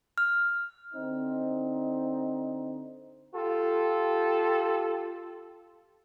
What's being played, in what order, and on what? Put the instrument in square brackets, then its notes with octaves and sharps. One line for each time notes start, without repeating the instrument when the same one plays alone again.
[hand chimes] F6
[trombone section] D3 C4 D#4
F4 G4 A4